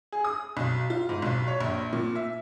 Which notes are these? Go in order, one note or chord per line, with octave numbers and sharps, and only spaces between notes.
G#4
D#6
B1
F4
G#2
B1
C#5
A#1
A#2
E5